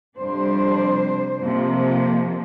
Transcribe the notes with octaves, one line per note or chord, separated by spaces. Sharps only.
F2 C3 G3 D4 C5
F2 C3 F3 A#3